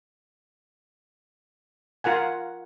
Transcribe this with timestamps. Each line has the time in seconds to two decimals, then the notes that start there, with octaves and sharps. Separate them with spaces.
2.04 F4 A#4 F#5 G#5